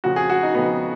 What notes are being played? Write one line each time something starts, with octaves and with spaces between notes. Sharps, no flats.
F2 C#3 F3 F#4
G#4
F#4
D#4
F2 C#3 F3 B3